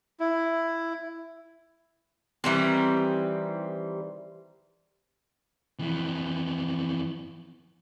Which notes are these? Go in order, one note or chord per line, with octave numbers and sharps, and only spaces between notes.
E4
D#3 E3 G3 C4
F2 E3